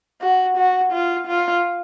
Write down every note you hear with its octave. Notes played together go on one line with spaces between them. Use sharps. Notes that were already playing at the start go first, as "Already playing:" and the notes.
F#4
F#4
F4
F4